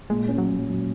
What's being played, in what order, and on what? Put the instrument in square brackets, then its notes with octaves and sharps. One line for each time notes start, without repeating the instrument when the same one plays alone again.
[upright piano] A#2 [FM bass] G#3
[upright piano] C#4
[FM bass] F#3
[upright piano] A#2
F#3